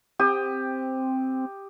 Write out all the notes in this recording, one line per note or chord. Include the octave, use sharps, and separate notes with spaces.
C4 G4 D#6